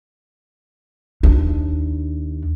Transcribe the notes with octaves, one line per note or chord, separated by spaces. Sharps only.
D#2 D4